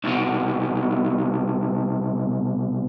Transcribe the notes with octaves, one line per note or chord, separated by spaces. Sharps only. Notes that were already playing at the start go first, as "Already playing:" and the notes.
C2 B2